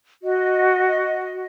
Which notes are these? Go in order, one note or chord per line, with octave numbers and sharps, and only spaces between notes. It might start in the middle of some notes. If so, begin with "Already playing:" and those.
F#4 D#5